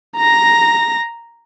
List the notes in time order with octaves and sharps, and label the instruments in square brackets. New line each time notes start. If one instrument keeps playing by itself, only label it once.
[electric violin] A#5 A#6